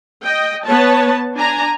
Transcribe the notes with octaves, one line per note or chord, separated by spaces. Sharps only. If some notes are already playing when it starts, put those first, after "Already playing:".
D#5 G5
B3 B4 C#5 A5
D4 G#5 A#5